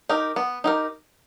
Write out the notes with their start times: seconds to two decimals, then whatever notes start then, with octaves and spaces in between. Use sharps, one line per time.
0.09 D#4 G4 A#4
0.36 B3
0.64 D#4 G4 A#4